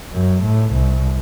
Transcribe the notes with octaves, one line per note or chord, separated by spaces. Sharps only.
F#2
A2
C2